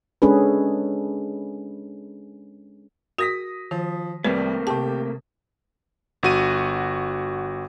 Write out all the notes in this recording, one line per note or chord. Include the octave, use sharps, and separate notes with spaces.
G#3 C#4 D4 G#4 A4 B4
F#4 A#4 D#6 A#6 B6
D#3 F3
C2 G3 A3 A#3 C4 B4
C3 G4 A5
G1 F#4 D#7